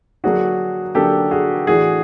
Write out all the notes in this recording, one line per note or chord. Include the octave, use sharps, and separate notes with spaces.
D3 F#3 A#3 D4 F#4 G#4
D3 F#3 A#3 D4 G4 A4
F#4 G#4
A2 E3 A3 D4 F#4 G#4